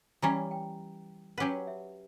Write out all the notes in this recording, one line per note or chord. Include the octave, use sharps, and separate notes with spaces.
E3 G3 C#4 A#5
G5
F#3 C#4 G4 B4 F#5
E5